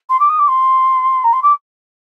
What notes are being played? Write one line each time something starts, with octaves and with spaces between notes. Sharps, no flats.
C6
D6
D#6
D6
C6
A#5
C6
D6